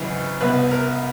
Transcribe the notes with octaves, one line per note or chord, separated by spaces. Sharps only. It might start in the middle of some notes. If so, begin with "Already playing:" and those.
Already playing: G#1 F#2 C#3 E3
C2 B2 B4
A#4